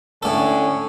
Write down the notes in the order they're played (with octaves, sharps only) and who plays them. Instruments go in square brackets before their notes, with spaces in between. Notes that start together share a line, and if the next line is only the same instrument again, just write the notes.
[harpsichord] A2 A4 [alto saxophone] D3 [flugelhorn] C#4